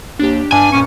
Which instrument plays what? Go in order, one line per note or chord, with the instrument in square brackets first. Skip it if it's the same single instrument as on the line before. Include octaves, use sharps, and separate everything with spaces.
[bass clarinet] D#2 [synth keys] D4 G4
[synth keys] G2 [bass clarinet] D4 [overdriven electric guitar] G#5
[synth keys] F2 A#2 C#7 [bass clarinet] C#4